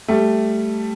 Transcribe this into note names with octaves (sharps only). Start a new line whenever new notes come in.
G3 A3